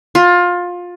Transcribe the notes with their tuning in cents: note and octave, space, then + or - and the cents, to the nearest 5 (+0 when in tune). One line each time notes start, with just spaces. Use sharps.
F4 +20